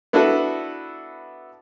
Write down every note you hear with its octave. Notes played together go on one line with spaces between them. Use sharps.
B3 D4 E4 F#4 A4 B4